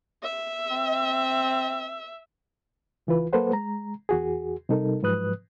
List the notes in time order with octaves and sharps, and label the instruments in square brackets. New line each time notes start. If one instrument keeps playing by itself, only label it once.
[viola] E5
[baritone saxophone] C4
[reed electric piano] C#2 E3 F4 B4
F#3 A#3 A4 B4 C5 F#5
G#3 A#5
E2 F#4 G#4
C3 G3 D#4 A4 A#4
G#2 F3 F#3 B4 D#6 F#6